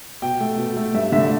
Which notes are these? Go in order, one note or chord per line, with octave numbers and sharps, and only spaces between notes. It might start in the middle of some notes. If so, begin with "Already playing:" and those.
B2 G5
A3
B2
A3
G2 E5
D3 A3 E5